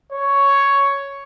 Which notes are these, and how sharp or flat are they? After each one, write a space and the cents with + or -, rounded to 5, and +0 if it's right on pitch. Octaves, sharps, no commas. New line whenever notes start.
C#5 +5